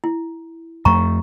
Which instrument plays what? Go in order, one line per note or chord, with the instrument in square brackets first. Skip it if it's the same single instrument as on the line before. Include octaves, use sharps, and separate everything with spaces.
[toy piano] E4
[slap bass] F2 A3 [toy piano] A#5 C#6